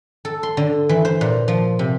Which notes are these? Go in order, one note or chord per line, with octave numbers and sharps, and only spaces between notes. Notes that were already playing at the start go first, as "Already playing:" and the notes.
A4
C6
D3
E3
C5
A#2
F3
C3